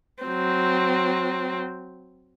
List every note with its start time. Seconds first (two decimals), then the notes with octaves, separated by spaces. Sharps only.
0.23 F#3 C4